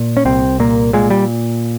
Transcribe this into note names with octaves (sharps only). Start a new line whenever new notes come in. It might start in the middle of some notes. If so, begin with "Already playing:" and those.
Already playing: A#2
C#4
C2 C4
A#2 A#3
A#2 G#3
G3